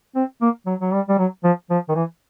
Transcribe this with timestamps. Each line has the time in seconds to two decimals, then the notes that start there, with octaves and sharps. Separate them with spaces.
0.16 C4
0.41 A#3
0.66 F#3
0.81 F#3
0.93 G3
1.09 G3
1.18 F#3
1.44 F3
1.70 F3
1.89 D#3
1.95 E3